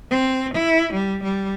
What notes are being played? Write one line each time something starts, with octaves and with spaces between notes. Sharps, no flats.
C4
E4
G3
G3